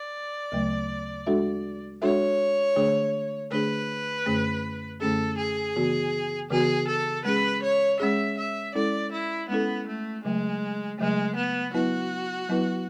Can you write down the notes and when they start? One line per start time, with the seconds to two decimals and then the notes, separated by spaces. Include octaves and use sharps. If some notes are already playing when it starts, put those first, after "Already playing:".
Already playing: D5
0.52 D2 C#3 F#3 A3
1.26 G#3 D4 F#4 A4 E5
2.02 G#3 D4 F#4 A4 C#5 E5
2.76 D3 A3 D4 G#4
3.51 D3 A3 D4 G#4 B4
4.26 F#2 D3 A3 C#4 G#4
5.00 F#2 D3 A3 C#4 G#4 A4
5.38 G#4
5.76 C#3 E3 B3 F#4
6.51 C#3 E3 B3 F#4 G#4
6.88 A4
7.25 G#3 C#4 G#4 B4
7.63 C#5
8.00 G#3 C#4 G#4 E5
8.38 E5
8.75 G#3 C#4 E4 A4 D5
9.12 E4
9.49 G#3 B3 C#4 E4 A4
9.87 A3
10.24 C#3 F#3 G#3 A3
10.99 C#3 F#3 G#3 A3
11.36 B3
11.74 F#3 B3 E4 F#4 B4
12.49 F#3 B3 E4 B4